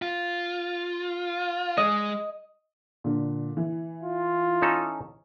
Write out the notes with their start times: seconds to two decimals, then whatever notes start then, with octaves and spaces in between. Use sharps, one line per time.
0.02 F4
1.77 G#3 D#5
3.04 A#2 D3
3.57 E3
4.03 F4
4.62 C#4 D#4 A4